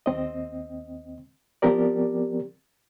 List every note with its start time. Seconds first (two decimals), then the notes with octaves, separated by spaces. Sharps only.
0.06 D#2 C4 D#5
1.62 F3 B3 C4 G4 A#4 D5